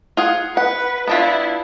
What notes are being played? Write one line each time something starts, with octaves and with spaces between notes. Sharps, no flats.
F4 G#4 F#5
B4 F#5
B3 D4 E4 F4